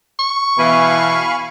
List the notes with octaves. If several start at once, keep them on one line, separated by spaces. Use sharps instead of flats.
C#6
B2 E3 F5 G#5 B5